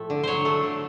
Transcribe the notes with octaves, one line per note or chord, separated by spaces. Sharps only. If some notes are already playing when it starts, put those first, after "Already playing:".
Already playing: A2 F3 A3
D3
F#3 C5 C#5
A3
D3